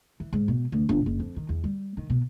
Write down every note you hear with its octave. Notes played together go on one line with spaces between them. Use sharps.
E3
G#2
B2
D2
G1
F#1
F2
D#3
E2
G3
D#3
B2